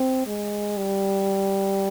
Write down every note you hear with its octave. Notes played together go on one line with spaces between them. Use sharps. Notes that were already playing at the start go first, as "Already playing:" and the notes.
Already playing: C4
G#3
G3